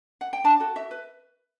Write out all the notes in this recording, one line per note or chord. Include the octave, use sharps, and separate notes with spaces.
F#5
G5
D4 A5
F#4 A4
F#4 E5
B4